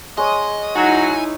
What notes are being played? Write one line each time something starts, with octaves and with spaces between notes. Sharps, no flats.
G#3 C#5 D#5
F#3 D#4 E4 F#4 G#5